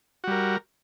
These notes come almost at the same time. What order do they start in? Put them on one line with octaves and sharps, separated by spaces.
F#4 G3 A#4